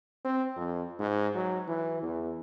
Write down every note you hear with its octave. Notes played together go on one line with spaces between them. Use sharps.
C4
F2
G#2
F#3
E3
E2